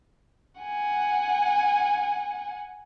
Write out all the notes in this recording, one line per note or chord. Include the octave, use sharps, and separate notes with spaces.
F#5 G#5